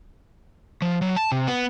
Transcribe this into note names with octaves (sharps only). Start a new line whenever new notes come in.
F3
F#3
A5
C3
B3